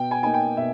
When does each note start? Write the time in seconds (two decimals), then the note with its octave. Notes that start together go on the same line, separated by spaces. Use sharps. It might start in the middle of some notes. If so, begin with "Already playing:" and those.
Already playing: B2 G5
0.11 G#5
0.23 A#3 D#4 G#5
0.34 G5
0.57 B2 E5